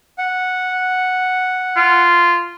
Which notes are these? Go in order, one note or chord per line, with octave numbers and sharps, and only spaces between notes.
F#5
F4